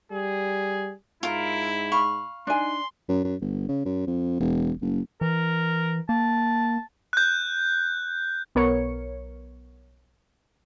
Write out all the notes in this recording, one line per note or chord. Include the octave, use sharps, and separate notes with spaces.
G3 G#4
G#2 E4 F4 A#4
F5 B5 C#6
D4 D#4 G#5 C6
F#2
F#2
G1
C#3
F#2
F2
E1
F#1
E3 A#4
A#3 A5
F#6 G6
B1 B3 A#4 C#5 C#7